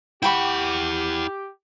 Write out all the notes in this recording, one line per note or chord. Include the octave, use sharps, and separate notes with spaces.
E4 G4 F#5 G5 B5 C#6